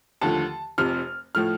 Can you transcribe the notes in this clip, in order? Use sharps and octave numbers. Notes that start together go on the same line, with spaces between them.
D#2 D3 F3 A3 A5
F1 F2 C3 F6
A2 F3 A3 F6